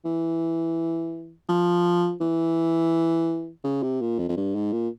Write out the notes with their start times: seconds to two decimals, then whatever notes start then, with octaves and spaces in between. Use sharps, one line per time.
0.05 E3
1.49 F3
2.21 E3
3.64 C#3
3.83 C3
4.01 A#2
4.19 F2
4.29 F2
4.37 G2
4.55 G#2
4.72 A#2